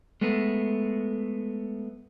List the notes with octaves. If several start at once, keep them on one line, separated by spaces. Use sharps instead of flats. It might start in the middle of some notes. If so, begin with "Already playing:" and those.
G#3 A3 B3